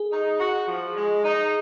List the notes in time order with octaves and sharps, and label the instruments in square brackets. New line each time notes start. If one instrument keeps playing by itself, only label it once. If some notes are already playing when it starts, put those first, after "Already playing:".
Already playing: [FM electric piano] G#4
[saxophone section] D#4
F#4
F3
G#3
D#4